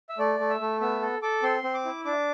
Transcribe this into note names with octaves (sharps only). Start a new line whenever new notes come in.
E5
A3 D5
A3
E5
A3
B3 E5
A4
A4 D6
C4 C6
C4
D6
E4
D4 D6